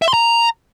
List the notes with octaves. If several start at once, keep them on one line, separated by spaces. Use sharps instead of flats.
E5
C6
A#5